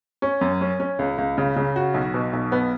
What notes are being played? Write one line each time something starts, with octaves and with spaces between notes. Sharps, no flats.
C#4
F#2
C#4
C#4
C#2
C#2
C#3
C#3
F#4
B1
B2
B1
B3